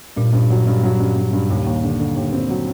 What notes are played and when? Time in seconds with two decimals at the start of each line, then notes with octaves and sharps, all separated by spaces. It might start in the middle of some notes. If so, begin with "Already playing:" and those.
0.16 G2 A#2
0.33 G2
0.50 F#3
0.67 G2
0.83 F#3
1.00 G2
1.16 G2
1.33 G2
1.50 D#2
1.67 D#2
1.83 D3
1.99 D3
2.16 D#2
2.33 C4
2.49 F#3